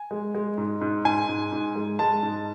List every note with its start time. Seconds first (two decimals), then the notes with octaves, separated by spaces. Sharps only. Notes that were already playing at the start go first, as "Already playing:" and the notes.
Already playing: G#5
0.11 G#3
0.35 G#3
0.58 G#2
0.81 G#2
1.05 G#2 G#5
1.28 G#2
1.52 G#2
1.75 G#3
1.99 G#3 A5
2.22 G#2